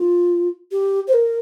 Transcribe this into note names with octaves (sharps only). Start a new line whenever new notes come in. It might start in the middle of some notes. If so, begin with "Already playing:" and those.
Already playing: F4
G4
C5
A#4